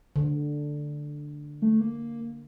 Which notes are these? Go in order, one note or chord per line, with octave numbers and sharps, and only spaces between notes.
D3
A3
A#3